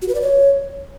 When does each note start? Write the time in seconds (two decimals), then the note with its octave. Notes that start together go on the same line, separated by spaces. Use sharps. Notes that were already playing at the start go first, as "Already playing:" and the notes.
0.02 F#4
0.08 B4
0.15 D5
0.21 C#5